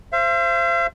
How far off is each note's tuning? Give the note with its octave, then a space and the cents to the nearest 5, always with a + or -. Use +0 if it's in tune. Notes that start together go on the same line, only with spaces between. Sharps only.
C5 +5 F5 -45